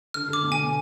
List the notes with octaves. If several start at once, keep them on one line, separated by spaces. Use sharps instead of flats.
D3 F6
D3
D6
B2
G#5
B2